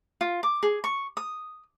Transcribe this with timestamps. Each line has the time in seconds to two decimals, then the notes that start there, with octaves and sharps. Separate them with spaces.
0.21 F4
0.43 D6
0.63 G#4
0.84 C#6
1.17 D#6